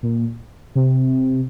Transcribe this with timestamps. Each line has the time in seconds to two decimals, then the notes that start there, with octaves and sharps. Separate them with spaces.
0.03 A#2
0.75 C3